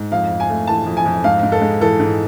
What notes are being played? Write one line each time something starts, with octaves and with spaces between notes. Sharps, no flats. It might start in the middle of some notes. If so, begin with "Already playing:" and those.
Already playing: G#2
F2 F5
F2
G#5
A3
E3 A5
F2
G#5
F2
G#2 F5
G#2
A4
G#3
E3 A4
G#2